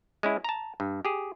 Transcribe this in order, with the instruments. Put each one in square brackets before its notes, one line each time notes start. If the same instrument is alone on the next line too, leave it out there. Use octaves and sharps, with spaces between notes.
[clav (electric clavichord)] G#3 C#4 E4
A5 A#5
G2
G4 G#4